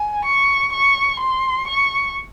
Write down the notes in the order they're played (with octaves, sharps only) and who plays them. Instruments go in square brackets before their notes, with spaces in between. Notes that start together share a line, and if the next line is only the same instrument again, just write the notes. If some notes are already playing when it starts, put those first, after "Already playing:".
Already playing: [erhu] G#5
C#6
C#6
C6
C#6